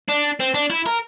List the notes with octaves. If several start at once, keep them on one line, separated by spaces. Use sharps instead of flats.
D4
C4
D4
E4
A#4